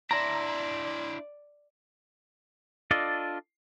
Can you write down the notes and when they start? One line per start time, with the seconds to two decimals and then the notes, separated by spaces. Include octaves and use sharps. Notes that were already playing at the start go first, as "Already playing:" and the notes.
0.11 D4 E4 D5 A#5 C6
2.91 D4 F4 A4 D5 D#5